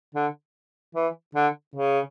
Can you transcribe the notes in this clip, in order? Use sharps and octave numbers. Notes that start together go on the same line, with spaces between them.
D3
E3
D3
C#3